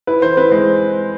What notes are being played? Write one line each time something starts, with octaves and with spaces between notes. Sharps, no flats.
E4 B4
E3 C5
C4 B4
G#3 C5